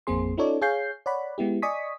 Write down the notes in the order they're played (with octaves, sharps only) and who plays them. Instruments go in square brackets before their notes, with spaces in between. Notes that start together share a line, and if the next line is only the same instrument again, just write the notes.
[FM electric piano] A1 F2 A#3 C4 G#4 C6
C#4 D#4 F4 A4 C#5 D5
G#4 C#5 F5 G#5 G6 C7
C#5 D5 F#5 B5
G#3 B3 E4 G4
D5 D#5 G#5 C#6 D#6 B6